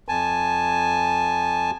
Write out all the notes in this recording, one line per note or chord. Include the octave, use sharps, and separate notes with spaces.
F2 G#5 A5